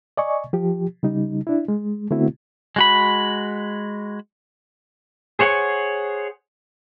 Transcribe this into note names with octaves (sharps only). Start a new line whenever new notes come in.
D5 D#5 G#5 C#6
F3 G4
C#3 G3 D#4
D4 E4
G#3
D3 A3 B3 C4 E4 F#4
G#3 F#4 B5
G#4 C5 C#5 F#5 G#5